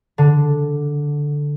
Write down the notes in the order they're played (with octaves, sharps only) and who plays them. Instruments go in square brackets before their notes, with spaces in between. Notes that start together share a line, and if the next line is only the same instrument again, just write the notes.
[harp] D3